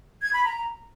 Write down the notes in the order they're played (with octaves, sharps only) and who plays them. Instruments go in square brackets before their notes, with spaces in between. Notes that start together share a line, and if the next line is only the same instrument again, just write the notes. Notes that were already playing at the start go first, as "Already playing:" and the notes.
[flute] G#6
B5
A#5